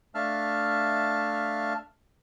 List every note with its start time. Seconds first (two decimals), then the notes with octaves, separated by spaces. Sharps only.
0.15 A3 D4 E5 F5 A5 F6